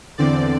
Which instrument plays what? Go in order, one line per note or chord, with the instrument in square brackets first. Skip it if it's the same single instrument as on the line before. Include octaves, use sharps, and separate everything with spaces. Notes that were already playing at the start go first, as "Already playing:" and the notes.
[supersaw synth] E2 D3 C4 D5